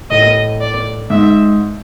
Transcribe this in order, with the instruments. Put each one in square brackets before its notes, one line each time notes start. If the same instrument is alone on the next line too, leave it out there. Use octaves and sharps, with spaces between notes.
[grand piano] A2 [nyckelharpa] D#5
[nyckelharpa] D5
[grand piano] G#2 [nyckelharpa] E5